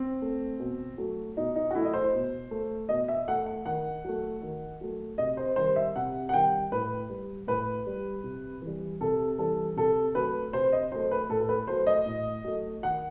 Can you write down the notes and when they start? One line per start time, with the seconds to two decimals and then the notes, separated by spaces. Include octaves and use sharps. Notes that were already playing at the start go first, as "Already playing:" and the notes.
Already playing: C4
0.22 A3
0.60 B2
0.98 F#3 A3
1.37 B2 D#4
1.56 D#4
1.71 F#4
1.75 F#3 A3 E4
1.85 D#5
1.94 C5
2.14 B2
2.51 A3
2.89 B2 D#5
3.08 E5
3.28 A3 F#5
3.46 F#5
3.65 D#3 F#5
4.05 F#3 A3
4.42 D#3
4.81 F#3 A3
5.18 C3 D#5
5.37 C5
5.56 D#3 G3 C5
5.76 E5
5.96 C3 F#5
6.29 F#5
6.33 D#3 G3 G5
6.72 A2 B4
7.10 G3
7.47 A2 B4
7.87 G3
8.24 C3
8.62 E3
8.67 G3
9.01 C3 A4
9.38 E3 G3 A4
9.76 C3 A4
10.15 F#3 A3 B4
10.53 C3 C5
10.72 D#5
10.92 F#3 A3 C5
11.11 B4
11.29 A2 A4
11.40 A4
11.49 B4
11.67 F#3 A3 C5
11.87 D#5
12.06 A2
12.44 F#3 A3
12.83 D#3 F#5